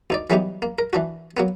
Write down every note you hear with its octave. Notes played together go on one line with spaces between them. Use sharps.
D2 D#4 D5
E3 F#3 G3 B3 D#4 G4
A#3
A#4
E3 D4 F#4
F#3 A#3 B3